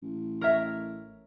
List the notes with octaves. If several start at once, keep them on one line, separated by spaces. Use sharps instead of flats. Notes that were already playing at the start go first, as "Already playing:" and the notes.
A1
A#4 C#5 E5